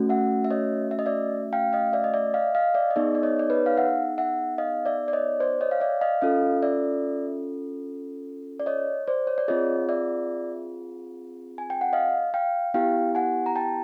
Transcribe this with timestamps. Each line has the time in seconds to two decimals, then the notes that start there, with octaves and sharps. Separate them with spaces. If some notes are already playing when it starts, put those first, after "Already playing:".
Already playing: A3 C#4 F#4
0.09 E5 F#5
0.45 E5
0.51 C#5 D#5
0.91 E5
0.99 D#5
1.06 D5 E5
1.53 F5 G5
1.73 D#5 F5
1.93 D5 E5
2.04 D#5
2.14 D5 E5
2.34 D#5 F5
2.55 D#5 F5
2.74 D5 E5
2.91 D#5
2.96 B3 D#4 G#4 D5 E5
3.15 D5
3.23 C#5 D#5
3.39 D5
3.50 B4 C#5
3.66 F5
3.77 E5 F#5
4.18 E5 F#5
4.58 D#5 F5
4.86 D5 E5
5.08 D5
5.13 C#5 D#5
5.40 C5 D5
5.61 C#5 D#5
5.71 F5
5.80 D5 E5
6.01 D#5 F5
6.21 C#4 F4 A4 D#5 F5
6.62 D5 E5
8.60 D5
8.66 C#5 D#5
9.08 C5 D5
9.27 C#5
9.38 D5
9.48 C4 F4 G#4 C#5 D#5
9.89 D5 E5
11.58 G#5
11.70 G5
11.81 F#5
11.93 D#5 F5
12.34 F5 G5
12.74 B3 E4 G4 F5 G5
13.15 F#5 G#5
13.46 A#5
13.56 G5 A5